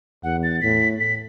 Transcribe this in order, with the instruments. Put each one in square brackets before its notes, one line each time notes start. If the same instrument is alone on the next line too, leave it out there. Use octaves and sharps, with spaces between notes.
[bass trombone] E2 [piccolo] F#5
[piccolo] A6
[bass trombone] A2 [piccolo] B6
[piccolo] B6